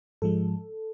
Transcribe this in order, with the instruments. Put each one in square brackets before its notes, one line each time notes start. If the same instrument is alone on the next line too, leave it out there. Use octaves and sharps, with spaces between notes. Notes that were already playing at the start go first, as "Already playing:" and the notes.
[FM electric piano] G#2 F3 G#3 A4